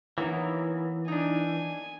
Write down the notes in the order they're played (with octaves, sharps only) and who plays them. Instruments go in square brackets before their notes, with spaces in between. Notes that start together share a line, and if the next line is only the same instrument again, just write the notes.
[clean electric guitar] E3 [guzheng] F#3 A#3 B3 [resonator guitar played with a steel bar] D#4 E4
[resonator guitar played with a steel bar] D4 D#4 [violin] G#5